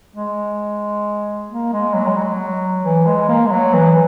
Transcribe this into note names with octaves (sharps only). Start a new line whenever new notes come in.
G#3
A#3
G#3
F#3
G#3
F#3
E3
G#3
A#3
G#3
F#3
E3